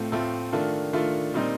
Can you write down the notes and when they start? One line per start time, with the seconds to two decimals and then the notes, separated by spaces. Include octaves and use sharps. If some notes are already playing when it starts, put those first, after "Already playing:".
Already playing: A2 A3 C4 F4
0.12 A2 A3 C4 F4
0.53 D#3 A3 D4 F4
0.93 D#3 A3 D4 F4
1.34 A#2 G3 C4 D#4